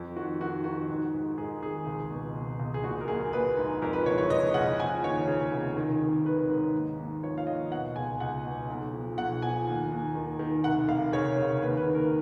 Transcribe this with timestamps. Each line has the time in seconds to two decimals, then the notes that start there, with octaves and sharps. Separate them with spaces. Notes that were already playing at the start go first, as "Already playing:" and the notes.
Already playing: F2
0.16 D#3 F#4
0.41 D#3 F#4
0.64 D#3 F#4
0.89 G#2
1.14 G#2
1.38 G#2 G#4
1.62 G#1 G#4
1.86 C#2
2.11 B2
2.35 B2
2.59 C#2
2.74 G#4
2.83 A#1 F#4
3.01 A#4
3.08 A#1 G#4
3.33 A#1 B4
3.57 G#2
3.82 F2 A#4
3.93 B4
4.06 F#1 C#5
4.18 C#5
4.30 F#1 D#5
4.54 C#3 F#5
4.79 F3 G#5
5.03 D#2 C#5
5.27 C#3
5.52 F1
5.77 D#3
6.01 G#1
6.25 D#3 B4
6.49 G#2
6.74 D#2
6.99 D#2
7.23 F3 C#5
7.38 F5
7.47 D#2 D#5
7.72 B2 F#5
7.96 C#2 G#5
8.20 C#2 F#5
8.44 B2
8.70 B1
8.93 F3
9.18 B1 F#5
9.42 F3 G#5
9.67 D#2
9.92 D#2
10.15 D#3
10.39 D#3
10.64 F1 F#5
10.88 F1 F5
11.12 C#3 C#5
11.38 C#3
11.61 D#2 B4
11.77 B4
11.86 D#3
11.95 A#4